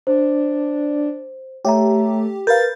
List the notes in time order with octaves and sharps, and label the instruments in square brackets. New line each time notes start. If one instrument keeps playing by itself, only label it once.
[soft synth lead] D4 [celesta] C5
[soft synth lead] A3 [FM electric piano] G4 [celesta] C#5 E5 A#5
[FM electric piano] A#4 B4 F5 [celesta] G6 [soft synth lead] A6